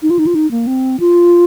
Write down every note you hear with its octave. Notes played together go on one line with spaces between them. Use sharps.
D#4
F4
D#4
F4
D#4
A#3
C4
F4